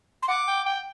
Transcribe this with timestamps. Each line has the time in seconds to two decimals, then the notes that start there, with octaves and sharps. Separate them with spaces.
0.22 C6
0.28 F#5 D6
0.48 G5
0.66 G5